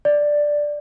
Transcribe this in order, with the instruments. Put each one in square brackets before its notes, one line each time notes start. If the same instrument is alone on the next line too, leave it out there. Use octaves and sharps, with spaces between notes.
[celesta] D5